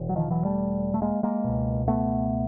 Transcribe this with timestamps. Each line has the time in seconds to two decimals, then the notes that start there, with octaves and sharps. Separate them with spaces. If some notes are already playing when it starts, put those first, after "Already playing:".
Already playing: E1 E2
0.09 F#3
0.16 D#3 F3
0.30 E3 F#3
0.45 G3 A3
0.94 A3
1.02 G#3 A#3
1.23 G#3 A#3
1.45 C#2 B2
1.88 A3 B3